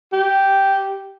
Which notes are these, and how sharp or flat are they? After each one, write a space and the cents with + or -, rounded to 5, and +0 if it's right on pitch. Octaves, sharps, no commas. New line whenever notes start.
G4 -5